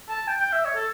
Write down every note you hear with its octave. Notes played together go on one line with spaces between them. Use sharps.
A5
G5
G5
E5
C#5
A4